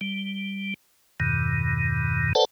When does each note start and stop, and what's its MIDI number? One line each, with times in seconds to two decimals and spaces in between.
0.01 0.74 55
1.20 2.33 40
1.20 2.33 43
1.20 2.33 47
1.20 2.33 51
2.35 2.45 69
2.35 2.45 71
2.35 2.45 72
2.35 2.45 74
2.35 2.45 78
2.35 2.45 81